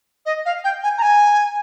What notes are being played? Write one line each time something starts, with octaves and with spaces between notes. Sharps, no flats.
D#5
F5
G5
G#5
A#5
G#5